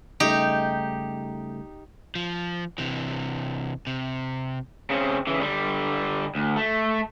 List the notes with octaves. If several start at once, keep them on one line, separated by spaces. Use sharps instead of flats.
C#3 G3 A3 D#4 G4
F3
C3 E3
C3
C#3 C4
C#3 E3
D3 G3
D2
A3